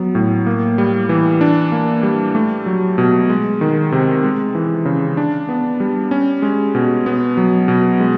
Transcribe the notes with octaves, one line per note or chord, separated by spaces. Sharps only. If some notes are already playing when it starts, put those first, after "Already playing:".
Already playing: F#3 B3
A2
A#3
G3
E3
D4
A#3
G3
A3
F#3
B2
G#3
D#3
C3
G#3
E3
C#3
D4
B3
G3
C#4
G#3
B2
B3
F#3
B2
G#3